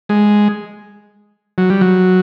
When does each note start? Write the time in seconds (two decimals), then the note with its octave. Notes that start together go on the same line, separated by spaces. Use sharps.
0.09 G#3
1.58 F#3
1.70 G3
1.81 F#3